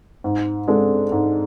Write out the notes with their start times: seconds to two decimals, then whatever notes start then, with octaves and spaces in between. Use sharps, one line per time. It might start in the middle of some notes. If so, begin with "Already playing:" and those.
0.24 G#2
0.68 G#3 D4 A4
1.12 G#2